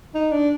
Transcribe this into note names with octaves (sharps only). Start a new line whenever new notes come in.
D#4
D4